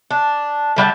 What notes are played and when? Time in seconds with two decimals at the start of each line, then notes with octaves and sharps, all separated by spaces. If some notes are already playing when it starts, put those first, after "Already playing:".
0.11 D4
0.76 D3 G3 F5 A5